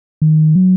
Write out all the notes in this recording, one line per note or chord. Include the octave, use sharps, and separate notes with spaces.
D#3
F#3